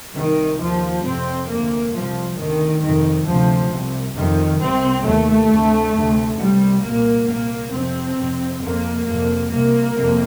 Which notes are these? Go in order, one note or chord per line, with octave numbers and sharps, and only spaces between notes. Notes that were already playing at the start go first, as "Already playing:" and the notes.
C2 C3 D#3
D#2 F3
F2 C3 C4
D2 C3 A#3
C2 C3 F3
D2 C3 D#3
F2 C3 D#3
D2 C3 F3
C2 C3
F2 C3 D#3
C2 C3 C4
D#2 A3
D2 C3
D2 C3
C2 C3 G3
C2 A#2 A#3
C2 A#2 A#3
F2 C3 C4
F2 C3
F2 C3 A#3
F2 C3 A#3
C2 C3 A#3
F2 C3